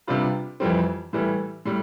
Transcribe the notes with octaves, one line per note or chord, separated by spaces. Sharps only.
C3 G3 D4 F4 B4
F2 E3 G3 C4
A2 E3 G3
A2 G3